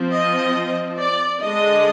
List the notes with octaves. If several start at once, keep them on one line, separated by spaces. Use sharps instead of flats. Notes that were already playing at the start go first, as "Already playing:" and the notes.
Already playing: F3 C4
D#5
D5
D3 G#3 D4 D#5